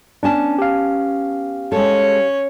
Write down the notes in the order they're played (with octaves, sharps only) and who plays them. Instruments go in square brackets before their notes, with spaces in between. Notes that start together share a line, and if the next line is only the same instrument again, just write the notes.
[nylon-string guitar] B3 C#4 A5 [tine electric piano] D4
[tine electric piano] G4 F5
[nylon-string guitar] G#3 A4 [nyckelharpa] C#4 C#5